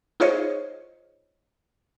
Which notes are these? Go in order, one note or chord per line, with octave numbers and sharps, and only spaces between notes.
D#4 F4 G#4 C5 C#5 D#5